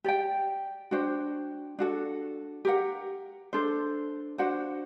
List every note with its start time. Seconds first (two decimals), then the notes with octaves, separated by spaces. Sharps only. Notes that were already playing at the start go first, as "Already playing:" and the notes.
0.04 G4 D5 G5
0.91 D4 F#4 C5 G5
1.79 D4 F#4 A4
2.65 G4 A#4 F#5
3.53 D4 A4 C5
4.38 D4 F#4 C5 F#5